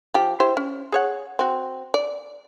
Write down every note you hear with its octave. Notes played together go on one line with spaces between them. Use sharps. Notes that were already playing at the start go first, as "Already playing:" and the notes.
F3 G4
E4 G4 C5
C#4
G#4 C#5 F#5
C4 F#4
D5